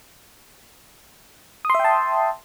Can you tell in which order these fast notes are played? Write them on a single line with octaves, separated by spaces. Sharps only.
D#6 C6 E5 G5 A5